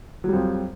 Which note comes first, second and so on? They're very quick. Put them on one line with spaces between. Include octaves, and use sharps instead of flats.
F#3 G3 F2